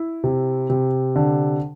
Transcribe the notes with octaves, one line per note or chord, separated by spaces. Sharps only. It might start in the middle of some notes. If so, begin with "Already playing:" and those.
Already playing: E4
C3
C3
D3